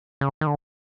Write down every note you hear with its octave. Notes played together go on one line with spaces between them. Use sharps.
C#3
D#3
D3